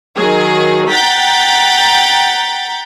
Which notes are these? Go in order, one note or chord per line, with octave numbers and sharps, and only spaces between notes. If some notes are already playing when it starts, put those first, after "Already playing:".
D#3 F#3 G#4
F#5 G5 A#5 G6 A6 B6